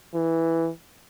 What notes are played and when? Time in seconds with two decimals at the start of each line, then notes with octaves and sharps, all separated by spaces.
0.14 E3